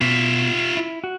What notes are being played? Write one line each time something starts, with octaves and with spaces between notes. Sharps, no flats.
B2 F4 E5
E4
F#4